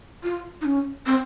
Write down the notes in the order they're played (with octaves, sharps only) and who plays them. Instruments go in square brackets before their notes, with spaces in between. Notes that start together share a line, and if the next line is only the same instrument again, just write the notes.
[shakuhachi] F4
D#4
C#4
C4